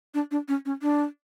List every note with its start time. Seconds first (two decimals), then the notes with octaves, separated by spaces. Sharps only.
0.14 D4
0.31 D4
0.48 C#4
0.66 C#4
0.82 D4